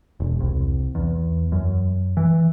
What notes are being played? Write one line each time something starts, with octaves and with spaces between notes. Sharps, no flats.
E1
C2
E2
F#2
E3